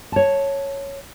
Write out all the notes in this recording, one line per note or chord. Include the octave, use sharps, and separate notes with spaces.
C#5 A5